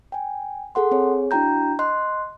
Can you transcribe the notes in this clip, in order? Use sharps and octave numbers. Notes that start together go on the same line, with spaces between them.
G5 G#5
G#4 A4 F#5 C6
C4 G#4 C#5
D4 E4 F#4 G5 A#5 G6
D#5 C6 F#6